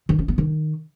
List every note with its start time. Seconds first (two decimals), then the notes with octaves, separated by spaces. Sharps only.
0.09 D#3
0.19 C#4
0.28 B3
0.38 D#3